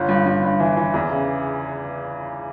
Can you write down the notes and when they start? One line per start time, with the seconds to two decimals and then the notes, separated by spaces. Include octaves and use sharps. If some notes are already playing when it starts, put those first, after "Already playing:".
Already playing: G1
0.09 G2
0.26 G2
0.43 G2
0.60 E3
0.77 E3
0.94 E2
1.10 C#3